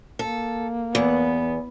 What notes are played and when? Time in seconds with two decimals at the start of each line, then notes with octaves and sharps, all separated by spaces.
0.19 A#3 A4
0.95 E2 B3